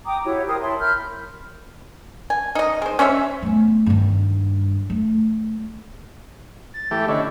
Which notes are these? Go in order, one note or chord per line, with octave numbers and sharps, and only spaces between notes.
G5 A#5 D6 D#6
E4 F#4 G4 C#5
A#4 C5 G5 D#6
E4 C#5 A5 C6
A#4 B5 F6 G6
G#5
D#4 D#5
G#3 C5
C#4 C5 C#5 E5
A3 B3
G2 D#3
A3
A6
E3 A3 G4
D3 C#4 E4 D#5